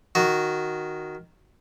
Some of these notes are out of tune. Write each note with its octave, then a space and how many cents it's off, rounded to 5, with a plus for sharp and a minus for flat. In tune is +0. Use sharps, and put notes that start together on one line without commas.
D#3 +0 F#4 +0